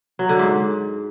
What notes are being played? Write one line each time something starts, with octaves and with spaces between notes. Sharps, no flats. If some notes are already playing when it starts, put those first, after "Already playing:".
F#3
D3
G#2